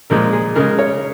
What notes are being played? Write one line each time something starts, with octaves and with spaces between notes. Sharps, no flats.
A#2 F3 G#3 A#4
G#4
C#3 G#3 A#4
C#5